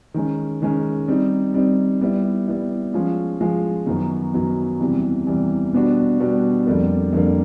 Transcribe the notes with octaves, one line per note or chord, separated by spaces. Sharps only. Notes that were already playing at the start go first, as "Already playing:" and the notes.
D#3 G#3 C#4
D#3 G#3 C#4
G3 C4 D#4
G3 C4 D#4
G3 B3 E4
G3 B3 E4
F3 G#3 C#4 F4
F3 G#3 C#4 F4
F#2 D#3 F#3 B3
F#2 D#3 F#3 B3
E2 C3 E3 G3
E2 C3 E3 G3
B2 G3 B3 D4 F#4
B2 G3 B3 D4 F#4
F2 D3 G3 A#3
F2 D3 G3 A#3